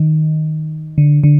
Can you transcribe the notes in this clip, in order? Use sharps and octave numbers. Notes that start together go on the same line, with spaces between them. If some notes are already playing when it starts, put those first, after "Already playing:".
Already playing: D#3
D3
D3